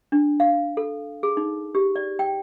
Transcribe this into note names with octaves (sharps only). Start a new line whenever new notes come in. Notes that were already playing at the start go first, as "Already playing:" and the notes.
D4
F5
A4
G#4
D#4
G4
D5
G5